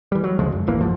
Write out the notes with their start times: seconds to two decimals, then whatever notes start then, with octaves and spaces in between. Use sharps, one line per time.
0.12 E3 G3
0.24 F#3
0.39 D2 C#3 F3 G#3
0.52 F#2
0.67 D1 G#1 E3 A#3
0.81 F2 G#2 F3